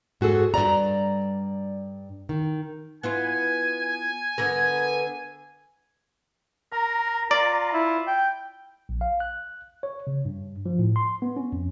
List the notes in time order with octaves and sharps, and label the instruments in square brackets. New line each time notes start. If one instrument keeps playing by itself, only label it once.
[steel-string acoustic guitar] G#2 F#4 G#4 A4
G2 E3 D5 A#5
D#3
[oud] B3 E4 F4 [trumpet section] G#5
[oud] D3 B3 A#4
[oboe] A#4 [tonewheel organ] A#5
[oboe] F4 [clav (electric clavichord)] D5
[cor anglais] E4
G5
[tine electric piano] A#1
F5
F#6
C#5
C#3
G2
F3
A2
C6
B3
C#4
F2